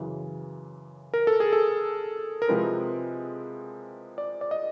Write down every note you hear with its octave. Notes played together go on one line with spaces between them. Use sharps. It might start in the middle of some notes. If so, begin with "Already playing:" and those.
Already playing: F#2 C#3 E3
A#4
A4
G#4
A4
A#4
C3 F3 G#3 C4 E4 B4
D5
D5
D#5